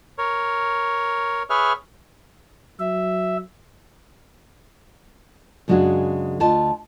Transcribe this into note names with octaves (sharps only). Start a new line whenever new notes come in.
A#4 C#5
G#4 B4 C#5 E5 F6
F#3 E5
F#2 C#3 G#3 D4 F#4
D2 F4 D#5 A5